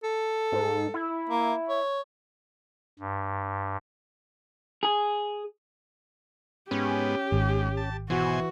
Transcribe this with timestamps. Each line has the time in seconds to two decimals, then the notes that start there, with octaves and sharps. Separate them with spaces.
0.04 A4
0.52 G#2
0.94 E4
1.30 A#3
1.69 C#5
2.99 G2
4.83 G#4
6.71 G#2 B3 C#4 G4
7.32 G#1 G#2
7.77 A5
8.10 B2 E3 F#4 C5 G#5